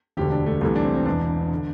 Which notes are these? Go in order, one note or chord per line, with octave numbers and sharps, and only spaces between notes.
E1 D2 D3 G4
D4
A3
C2 C3 E3 A3
D4
C4
C4
E1 E2 E3 D4
D3